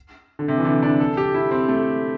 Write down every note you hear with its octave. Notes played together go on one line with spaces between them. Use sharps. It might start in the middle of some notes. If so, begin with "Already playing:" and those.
D3
C3
E3
D3
D4
A4
G4
E4
C4
A3